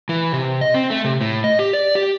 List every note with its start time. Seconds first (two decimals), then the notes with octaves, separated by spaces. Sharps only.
0.09 E3
0.33 C3
0.61 D#5
0.74 C4
0.90 A3
1.04 C3
1.21 A2
1.44 D#5
1.59 G4
1.73 D5
1.95 G4